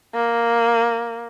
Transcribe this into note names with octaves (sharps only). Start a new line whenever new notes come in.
A#3